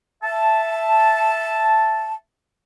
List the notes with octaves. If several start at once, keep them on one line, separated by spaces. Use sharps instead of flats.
E5 A5